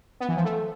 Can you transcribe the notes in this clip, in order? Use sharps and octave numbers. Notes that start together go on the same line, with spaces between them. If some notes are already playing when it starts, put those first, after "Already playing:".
B3
E3
F3
A3